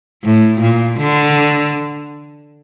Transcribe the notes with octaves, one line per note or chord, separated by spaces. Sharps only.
A2
A#2
D3